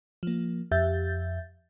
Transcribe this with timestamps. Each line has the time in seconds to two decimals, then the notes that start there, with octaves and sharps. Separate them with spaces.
0.23 F3 A#3
0.71 F2 G4 E5 G6 A6